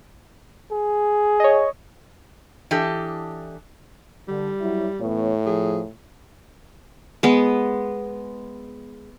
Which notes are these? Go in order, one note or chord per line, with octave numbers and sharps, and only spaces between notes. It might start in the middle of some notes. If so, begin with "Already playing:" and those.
G#4
C#5 D#5
E3 D4 G4 A4 D#5
D3 G3
F#3 E4
A2 E3 B3 C#5
F3 G#4
G#3 B3